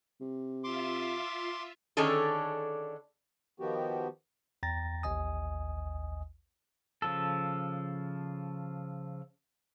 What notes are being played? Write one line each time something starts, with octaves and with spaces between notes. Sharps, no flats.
C3
F4 E5 C6 D6
D3 D#3 C#4 D4 G#4 A4
D#3 F3 B3 F#4 G4
E2 G5 A#5 A6 A#6
A1 D#2 D#5 G#5 D#6
C#3 F3 A4